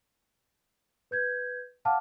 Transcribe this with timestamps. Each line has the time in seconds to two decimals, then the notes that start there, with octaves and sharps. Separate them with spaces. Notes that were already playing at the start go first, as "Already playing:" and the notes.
1.11 B4 G6 G#6
1.85 F5 F#5 A5 D6 F6